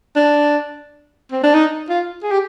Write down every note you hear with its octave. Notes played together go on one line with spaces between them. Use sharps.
D4
C4
D4
D#4
F4
G#4
G4